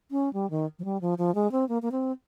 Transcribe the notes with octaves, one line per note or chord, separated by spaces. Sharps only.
C#4
G3
D#3
F3
G3
F3
F3
G#3
C4
A#3
A#3
C4